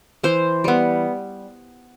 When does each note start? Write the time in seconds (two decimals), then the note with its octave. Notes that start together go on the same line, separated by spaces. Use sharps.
0.24 E3 C5
0.64 G3 B3